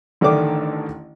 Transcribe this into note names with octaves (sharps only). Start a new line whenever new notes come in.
A1 D3 D#3 A3 D4 D6